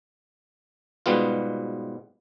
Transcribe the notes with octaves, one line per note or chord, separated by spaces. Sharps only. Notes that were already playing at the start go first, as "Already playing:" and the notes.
G#2 B2 G3 B3 F4